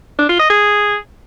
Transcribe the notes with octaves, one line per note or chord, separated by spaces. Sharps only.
D4
F4
D#5
G#4